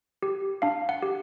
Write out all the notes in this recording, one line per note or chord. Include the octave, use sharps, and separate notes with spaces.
G4
D4 F5
F#5
G4